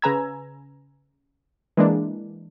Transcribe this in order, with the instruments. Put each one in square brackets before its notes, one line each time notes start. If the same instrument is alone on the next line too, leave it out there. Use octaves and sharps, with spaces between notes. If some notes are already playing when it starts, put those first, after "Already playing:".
[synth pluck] C#3 B4 G#5 A#5 E6 G#6
E3 G#3 A#3 D4